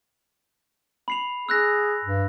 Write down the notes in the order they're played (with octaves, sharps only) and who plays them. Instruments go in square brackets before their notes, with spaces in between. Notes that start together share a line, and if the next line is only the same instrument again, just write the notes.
[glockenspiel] B5 C7 F7
[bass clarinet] G#4 [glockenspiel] E6 F#6 A#6
[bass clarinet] G2